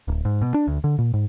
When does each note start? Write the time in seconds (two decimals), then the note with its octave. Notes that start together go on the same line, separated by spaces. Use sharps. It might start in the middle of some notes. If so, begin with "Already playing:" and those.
0.08 D1
0.25 G#2
0.42 B2
0.54 D4
0.67 D2
0.84 D3
0.99 A#2
1.14 G#2